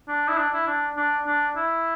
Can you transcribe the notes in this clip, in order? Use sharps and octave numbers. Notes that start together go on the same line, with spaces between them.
D4
E4
D4
E4
D4
D4
D4
E4